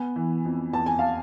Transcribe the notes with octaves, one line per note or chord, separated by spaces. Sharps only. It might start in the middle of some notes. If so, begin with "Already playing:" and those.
Already playing: B3 G#5
E3
F2
E2 A5
G#5
F5 A5